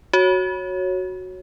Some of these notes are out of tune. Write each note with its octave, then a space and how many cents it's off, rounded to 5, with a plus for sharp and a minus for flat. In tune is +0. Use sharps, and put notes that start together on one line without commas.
F#4 +0 C#5 -10